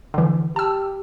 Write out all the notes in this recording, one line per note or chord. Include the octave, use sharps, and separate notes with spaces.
D3 E3
G4 A5 E6